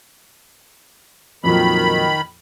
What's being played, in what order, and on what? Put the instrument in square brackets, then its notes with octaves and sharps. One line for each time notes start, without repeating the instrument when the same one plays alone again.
[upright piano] F2 A#2 F#3 [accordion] D#3 B5